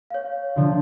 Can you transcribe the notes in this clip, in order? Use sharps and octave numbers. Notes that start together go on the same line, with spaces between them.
C#5 F5
D3 F3 A#3